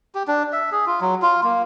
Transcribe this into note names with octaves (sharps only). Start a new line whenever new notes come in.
G4
D4
E5
G#4
F4
F#3
F4
A#3